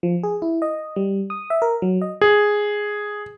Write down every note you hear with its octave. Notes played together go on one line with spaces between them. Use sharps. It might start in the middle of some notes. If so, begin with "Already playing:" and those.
F3
G#4
E4
D#5
G3
D#6
E5
A#4
F#3
D#5
G#4